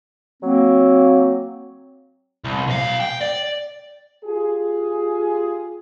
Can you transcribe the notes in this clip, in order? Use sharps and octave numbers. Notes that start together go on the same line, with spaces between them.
F#3 A#3 C4
C2
B1 F5
G5
D5
F4 G4 G#4